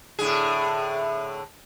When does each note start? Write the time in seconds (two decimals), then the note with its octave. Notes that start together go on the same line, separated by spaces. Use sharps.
0.19 A2 D3 G#4